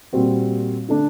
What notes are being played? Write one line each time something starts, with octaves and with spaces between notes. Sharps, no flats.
A#2 G3 C4 F#4
D3 A3 D4